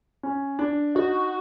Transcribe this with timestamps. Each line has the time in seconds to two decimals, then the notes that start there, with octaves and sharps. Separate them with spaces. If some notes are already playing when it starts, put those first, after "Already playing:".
0.23 C#4
0.59 D4
0.95 D#4 F#4